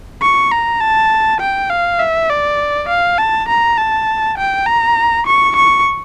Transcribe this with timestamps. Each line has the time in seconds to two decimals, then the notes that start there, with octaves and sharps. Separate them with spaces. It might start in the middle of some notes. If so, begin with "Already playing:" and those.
0.22 C#6
0.52 A#5
0.81 A5
1.40 G5
1.70 F5
2.00 E5
2.30 D5
2.89 F5
3.18 A5
3.49 A#5
3.78 A5
4.38 G5
4.67 A#5
5.26 C#6
5.56 C#6